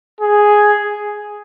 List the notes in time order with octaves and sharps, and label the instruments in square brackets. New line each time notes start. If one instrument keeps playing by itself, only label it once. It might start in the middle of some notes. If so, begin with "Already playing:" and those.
[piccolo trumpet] G#4